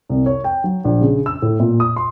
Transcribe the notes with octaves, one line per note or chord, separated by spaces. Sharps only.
C2
C#5
G5
F#3
A#1
C#3
E6
A2
A#2
D#6
C6